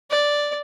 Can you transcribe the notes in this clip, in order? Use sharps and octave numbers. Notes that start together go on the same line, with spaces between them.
D5